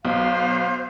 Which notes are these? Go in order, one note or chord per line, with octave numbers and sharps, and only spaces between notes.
B1 C5 F5